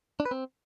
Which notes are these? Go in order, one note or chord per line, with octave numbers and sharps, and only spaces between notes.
D4
B4
C4